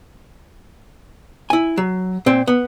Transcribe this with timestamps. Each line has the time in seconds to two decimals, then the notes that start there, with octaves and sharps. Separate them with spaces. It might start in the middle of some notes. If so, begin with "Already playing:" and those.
1.50 E4 G#5
1.77 F#3
2.26 A#2 C4
2.47 B3